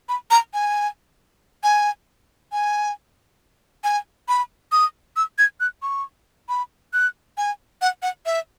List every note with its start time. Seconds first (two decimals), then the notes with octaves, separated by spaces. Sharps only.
0.09 B5
0.31 A#5
0.54 G#5
1.63 G#5
2.52 G#5
3.84 G#5
4.28 B5
4.72 D#6
5.16 E6
5.39 G#6
5.60 F#6
5.82 C#6
6.49 B5
6.93 F#6
7.37 G#5
7.82 F#5
8.02 F#5
8.26 E5